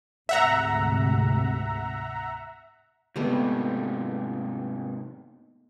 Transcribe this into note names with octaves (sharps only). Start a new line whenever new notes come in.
D2 G#2 C3 E5 F#5 A#5
G#2 C3 G3 A3 B3 D#4